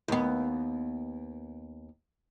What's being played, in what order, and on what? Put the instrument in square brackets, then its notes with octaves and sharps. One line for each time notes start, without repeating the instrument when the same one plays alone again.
[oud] D#2 B3